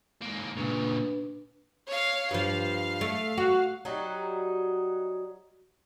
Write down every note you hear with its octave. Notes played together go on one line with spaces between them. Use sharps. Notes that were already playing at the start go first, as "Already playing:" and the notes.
G#2 A#3
A#2 C#3 D4 B4
C#5 F5
G2 F3 F5
A3
F#4
F#3 G3 D#4 F#4